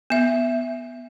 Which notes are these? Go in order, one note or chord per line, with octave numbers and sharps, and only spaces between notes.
B3 E5